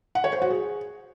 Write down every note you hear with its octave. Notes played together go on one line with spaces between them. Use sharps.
F#5
C#5
C5
F#4
G#4